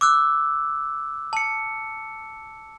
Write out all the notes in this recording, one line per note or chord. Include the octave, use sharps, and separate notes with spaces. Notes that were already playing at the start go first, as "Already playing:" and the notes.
D6 E6 F#6
A5 C#7